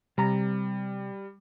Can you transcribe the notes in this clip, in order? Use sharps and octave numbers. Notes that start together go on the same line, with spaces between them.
C3 G3 A#5